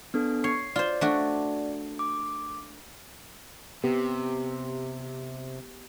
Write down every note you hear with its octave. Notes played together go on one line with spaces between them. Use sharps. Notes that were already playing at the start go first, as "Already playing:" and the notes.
B3 D4 A4
C#5 C7
F4 C5 D5
A3 D4 F#4
D6
C3 B3 G4